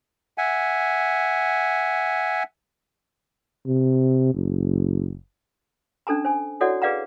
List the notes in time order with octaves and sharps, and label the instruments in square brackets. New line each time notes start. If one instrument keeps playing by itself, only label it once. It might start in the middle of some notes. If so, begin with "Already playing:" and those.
[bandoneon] E5 F#5 G#5
[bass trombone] C3
F#1
[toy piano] C#4 D4 A4 A5 A#5
C5 G#5
E4 F#4 A4 C#5 D5 F#5
G#4 B4 D5 F5 F#5 A#5